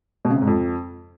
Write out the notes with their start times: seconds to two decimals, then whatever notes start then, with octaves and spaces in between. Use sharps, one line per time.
0.25 B2
0.30 C#3
0.36 C3
0.42 G#2
0.47 F2